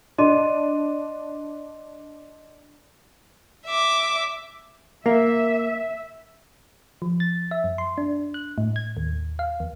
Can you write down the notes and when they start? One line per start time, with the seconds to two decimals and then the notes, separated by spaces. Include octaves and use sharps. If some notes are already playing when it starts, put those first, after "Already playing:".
0.18 D4 D#5 C6 D#7
3.66 E5 D6
5.06 A#3 E5
7.02 F3
7.20 A6
7.51 E5
7.64 F#2
7.78 C6
7.98 D4
8.34 F#6
8.58 A2
8.76 G#6
8.97 D#2
9.39 F5
9.60 E2